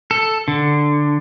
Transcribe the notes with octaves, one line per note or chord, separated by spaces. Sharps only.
A4
D3